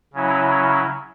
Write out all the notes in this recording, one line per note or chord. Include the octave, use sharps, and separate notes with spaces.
C#3 F#3 C#4 E4